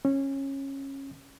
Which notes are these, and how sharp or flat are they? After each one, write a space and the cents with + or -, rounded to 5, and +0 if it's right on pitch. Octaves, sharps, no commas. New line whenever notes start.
C#4 -20